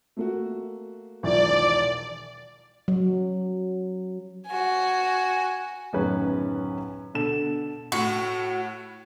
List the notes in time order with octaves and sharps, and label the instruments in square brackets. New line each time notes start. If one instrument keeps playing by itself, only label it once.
[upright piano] A3 A#3 F#4
[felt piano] E1 B1 D#3 [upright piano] F3 E4 [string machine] D5
[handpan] F#3
[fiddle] F#4 G#5
[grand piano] D1 F#2 D#3 B3 C#4 B4
B2 D3 A4 E7
[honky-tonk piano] A2 [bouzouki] F#4